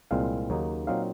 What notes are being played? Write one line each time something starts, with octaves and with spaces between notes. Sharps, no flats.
C2 A#2 G#3 C4 F5
D#2 C#3 F#3 A#3 D#4
A#2 F#3 C4 D#4 F5